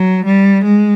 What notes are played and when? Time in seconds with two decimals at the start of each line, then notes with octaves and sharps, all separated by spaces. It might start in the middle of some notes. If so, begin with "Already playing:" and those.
Already playing: F#3
0.25 G3
0.64 G#3